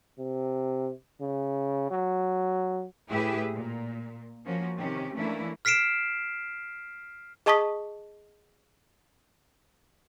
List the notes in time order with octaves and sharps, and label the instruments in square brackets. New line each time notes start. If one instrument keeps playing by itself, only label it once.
[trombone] C3
C#3
F#3
[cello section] A2 E4 G4 G#4 B4 E5
A#2
F3 A#3 C#4 F#4
C3 D#3 C#4 G4
E3 A3 A#3 C#4 D4 E4
[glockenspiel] F6 B6 C7 D7 E7
[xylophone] G#4 D#5 A5 C#6 D#6 B6